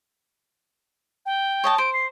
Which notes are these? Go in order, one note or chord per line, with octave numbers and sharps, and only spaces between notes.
G5
C#5 D#5 A5
C5 D7
C7